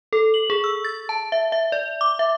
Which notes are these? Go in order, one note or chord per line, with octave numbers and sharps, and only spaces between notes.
A4
F#7
G#4
E6
A6
A5
E5
E5
D5
D6
E5